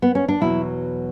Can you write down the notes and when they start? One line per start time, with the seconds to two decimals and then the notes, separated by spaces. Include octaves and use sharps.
0.02 B3
0.15 C#4
0.28 D4
0.41 E2 B2 F#3 E4